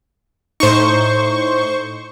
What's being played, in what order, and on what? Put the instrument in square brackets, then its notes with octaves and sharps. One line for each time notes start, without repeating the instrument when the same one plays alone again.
[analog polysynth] A2 D#4 [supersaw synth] C5 C#6